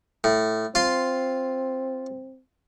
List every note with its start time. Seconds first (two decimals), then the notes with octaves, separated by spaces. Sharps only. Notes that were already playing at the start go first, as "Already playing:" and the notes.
0.24 A2
0.75 C4 F4 C6